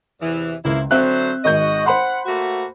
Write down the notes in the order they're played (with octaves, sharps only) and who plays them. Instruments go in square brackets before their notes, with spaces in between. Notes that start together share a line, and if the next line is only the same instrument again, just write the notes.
[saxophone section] E2 C3 E3
[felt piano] C#2 [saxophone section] A#3 C4 E4
[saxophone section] D3 F#3 C5 [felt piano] C4 E5 F#6
[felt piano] G#1 G#3 G6 [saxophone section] F#4 D#5
[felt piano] C5 B5 C6 [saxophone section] F#5
[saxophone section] A3 A#3 F#4